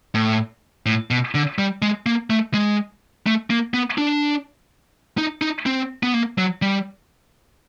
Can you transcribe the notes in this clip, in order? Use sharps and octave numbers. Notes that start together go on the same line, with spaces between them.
A2
A2
B2
D3
G3
G#3
A#3
A3
G#3
A3
A#3
B3
D4
D#4
D#4
C4
B3
A#3
F#3
G3